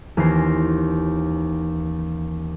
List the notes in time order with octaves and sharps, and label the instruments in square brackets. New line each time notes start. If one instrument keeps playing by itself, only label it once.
[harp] D#2 E3 C#4 C5 A#6 C7